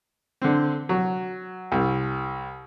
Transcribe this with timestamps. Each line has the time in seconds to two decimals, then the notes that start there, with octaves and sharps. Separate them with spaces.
0.42 D3 C4
0.89 F#3
1.72 C2